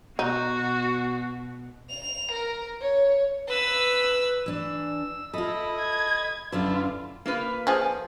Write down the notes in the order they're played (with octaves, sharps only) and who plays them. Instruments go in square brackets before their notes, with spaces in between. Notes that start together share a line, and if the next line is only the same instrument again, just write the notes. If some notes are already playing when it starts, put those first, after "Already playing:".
[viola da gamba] B2 [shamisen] D#4 [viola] F#4
[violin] F7
A#4
C#5
[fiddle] B4 E6
[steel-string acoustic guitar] E3 D4 [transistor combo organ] E6
[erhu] E4 [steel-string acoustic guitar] F4 A4 [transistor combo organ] D#5 B5
[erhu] G#6
[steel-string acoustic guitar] F#2 D3 B4 [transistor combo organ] D4 E4 [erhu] F4
[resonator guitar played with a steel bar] A#3 F4 B4
[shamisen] F3 G#4